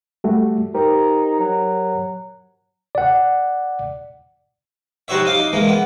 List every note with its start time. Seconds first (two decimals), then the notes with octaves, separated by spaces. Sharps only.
0.24 G3 A3 F#4
0.75 D#4 G4 A#4 C5
1.39 F#3
2.95 D5 F#5
5.08 G3 D#4 F#4 C5 C#5 E5
5.25 D#4 F5 D6
5.39 D#4
5.53 E3 G#3 A#3
5.68 B3